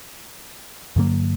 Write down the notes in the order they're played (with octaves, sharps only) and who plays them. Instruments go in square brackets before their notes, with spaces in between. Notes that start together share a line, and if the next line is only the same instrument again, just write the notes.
[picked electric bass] G2 D3 F#3 A#3